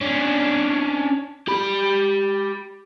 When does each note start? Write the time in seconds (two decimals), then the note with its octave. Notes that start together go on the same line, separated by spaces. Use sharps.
0.01 C#4 D4
1.48 G4 B5